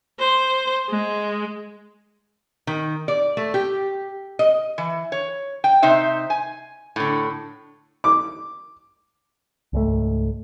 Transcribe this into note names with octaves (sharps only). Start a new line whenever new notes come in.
C5
G#3
D#3
D5
A3
G4
D#5
E3
C#5
G5
C3 D#4 C5 E5
G#5
A2 D3
D6
C#2 G#2 A3